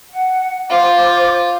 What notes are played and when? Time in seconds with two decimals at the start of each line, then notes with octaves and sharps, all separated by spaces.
0.11 F#5
0.70 F4 C5 F5 D6